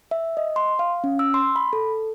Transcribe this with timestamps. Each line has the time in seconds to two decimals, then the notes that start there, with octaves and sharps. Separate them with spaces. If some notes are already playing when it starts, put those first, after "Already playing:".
0.11 E5
0.37 D#5
0.56 C6
0.79 F5
1.04 C#4
1.19 E6
1.34 C6
1.56 B5
1.73 A4